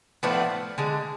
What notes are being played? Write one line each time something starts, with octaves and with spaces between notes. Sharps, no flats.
A2 F3 A3 B3 D4
D3 G#3